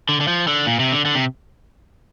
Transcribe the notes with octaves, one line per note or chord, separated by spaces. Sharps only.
D3
D3
F3
D3
A#2
C3
D3
D3
C3